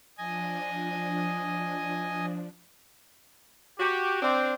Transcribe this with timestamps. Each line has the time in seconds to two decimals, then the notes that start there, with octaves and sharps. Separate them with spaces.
0.18 F3 D4 D#5 G#5
3.79 F#4 G4
4.22 C4 D4